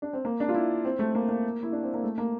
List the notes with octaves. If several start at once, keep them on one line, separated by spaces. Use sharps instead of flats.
D4
C4
A#3
D4
F4
E4
C4
A3
A#3
A#3
E4
D4
C4
A#3
A3
A#3